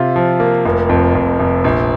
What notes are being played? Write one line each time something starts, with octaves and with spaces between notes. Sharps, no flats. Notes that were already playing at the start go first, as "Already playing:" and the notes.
Already playing: C3 F4
F3
A#3
F1
F2
F2
F1
A#1